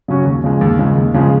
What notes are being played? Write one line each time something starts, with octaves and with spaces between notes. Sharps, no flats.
C#3 F#3 C#4 F#4
D#2
C#3 F3 G#3
D#2
C#3 F3 G#3
D#2
C#3 F3 G#3